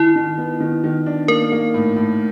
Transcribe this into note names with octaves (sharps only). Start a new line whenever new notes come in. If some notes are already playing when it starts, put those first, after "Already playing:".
Already playing: D#3 E4
D#3
B3
D#3
D#3
D4
A#3 A#4
A#3
A2
A2